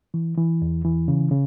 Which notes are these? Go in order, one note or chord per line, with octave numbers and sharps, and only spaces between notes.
E3
E3
E2
E3
C#3
C#3